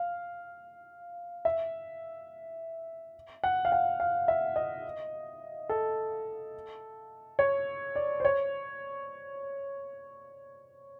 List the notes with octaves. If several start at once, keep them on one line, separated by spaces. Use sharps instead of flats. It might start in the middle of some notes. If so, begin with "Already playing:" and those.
Already playing: F5
E5
F#5
F5
F#5
F5
E5
D#5
A4
C#5
D5
C5
C#5